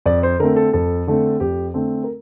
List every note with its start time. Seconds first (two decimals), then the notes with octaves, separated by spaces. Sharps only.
0.06 F2 D5
0.23 C5
0.39 D3 A3 C4 A#4
0.56 A4
0.73 F2 A4
1.07 D3 A3 C4
1.40 F2 G4
1.74 D3 A3 C4
2.04 A#4